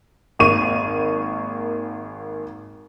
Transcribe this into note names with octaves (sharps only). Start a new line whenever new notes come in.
G#1 A#3 C#6 D#7